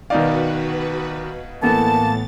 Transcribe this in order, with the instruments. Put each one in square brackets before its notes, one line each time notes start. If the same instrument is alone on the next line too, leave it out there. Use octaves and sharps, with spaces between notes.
[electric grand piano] B2 D#4 F5 [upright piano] D#3 D5 [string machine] F#4 B4
[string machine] A2 A6 [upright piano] E3 B3 A4 [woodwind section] A#3 A5